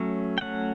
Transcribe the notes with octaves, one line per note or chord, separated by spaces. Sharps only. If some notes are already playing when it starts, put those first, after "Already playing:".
Already playing: F#3 A3 C#4
G5
F#3 A3 C#4 F#5